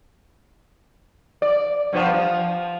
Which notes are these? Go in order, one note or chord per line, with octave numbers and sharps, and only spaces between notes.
D5
G2 F3 B3
F3